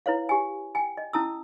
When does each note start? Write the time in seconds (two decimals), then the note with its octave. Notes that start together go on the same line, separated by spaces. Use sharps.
0.06 E4 B4 C#5 F5
0.29 G4 G#5
0.75 G5 G#5
0.97 D#5
1.13 C#4 E4 A5 D#6 E6